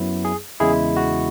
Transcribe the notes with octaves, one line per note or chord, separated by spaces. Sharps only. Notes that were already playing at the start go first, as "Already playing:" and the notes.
Already playing: F#2 F#3 B3 E4
G#4
E2 C#3 G#3 E4 G#4
F#4